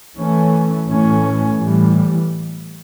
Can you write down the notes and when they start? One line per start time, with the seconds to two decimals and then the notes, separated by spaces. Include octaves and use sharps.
0.16 E3 A3 C#4
0.87 A2 E3 A3 C#4
1.58 A2 E3 G3